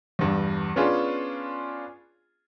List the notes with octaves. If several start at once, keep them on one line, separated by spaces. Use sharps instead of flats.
E2 G2
B3 C#4 D4 F4 G#4